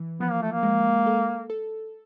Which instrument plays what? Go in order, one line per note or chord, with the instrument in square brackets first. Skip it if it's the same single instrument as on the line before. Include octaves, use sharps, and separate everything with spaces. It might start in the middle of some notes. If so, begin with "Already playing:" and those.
Already playing: [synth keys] E3
[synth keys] F3 [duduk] B3
[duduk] A#3
A3
A#3
[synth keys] G#3
A4
A4